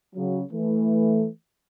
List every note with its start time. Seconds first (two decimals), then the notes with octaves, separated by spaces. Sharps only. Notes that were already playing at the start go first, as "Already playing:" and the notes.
0.16 C#3 F#3
0.52 E3 A3